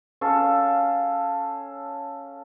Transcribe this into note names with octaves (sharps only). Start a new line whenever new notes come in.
C#4 A4 F5